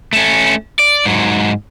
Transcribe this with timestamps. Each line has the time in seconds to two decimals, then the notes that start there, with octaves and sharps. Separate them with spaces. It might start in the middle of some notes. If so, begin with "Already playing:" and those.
0.13 A3 C#4
0.79 D5
1.05 G#2 F#3